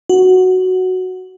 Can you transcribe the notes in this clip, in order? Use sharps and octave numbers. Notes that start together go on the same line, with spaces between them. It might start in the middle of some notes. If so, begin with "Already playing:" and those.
F#4